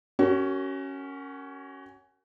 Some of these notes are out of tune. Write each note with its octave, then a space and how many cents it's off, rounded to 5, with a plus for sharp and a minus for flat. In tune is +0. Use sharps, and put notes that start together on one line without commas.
C#4 +0 F#4 +35 A#4 -15